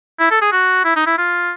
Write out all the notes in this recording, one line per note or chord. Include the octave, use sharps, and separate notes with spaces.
E4
A4
G#4
F#4
E4
D#4
E4
F4